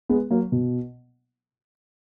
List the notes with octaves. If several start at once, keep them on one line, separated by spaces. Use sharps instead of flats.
G#3 B3
F#3 A#3
B2